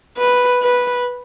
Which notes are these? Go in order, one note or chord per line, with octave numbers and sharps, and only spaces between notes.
B4
B4